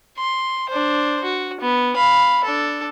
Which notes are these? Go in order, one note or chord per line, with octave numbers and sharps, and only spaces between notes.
C6
D4 C5
F#4
B3
F5 B5
D4 A4